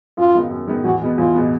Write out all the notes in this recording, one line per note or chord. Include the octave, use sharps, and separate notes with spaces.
F#2 F4
D#3 G#3 B3 D#4
F#2
D#3 G#3 B3 D#4
E2 F#4
B2 G#3 B3
E2 F4
B2 G#3 B3